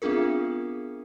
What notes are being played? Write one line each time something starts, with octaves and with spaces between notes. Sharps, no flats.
B3 C4 D4 F4 G#4 A#4